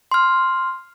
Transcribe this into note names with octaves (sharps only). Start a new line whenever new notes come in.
C6 F6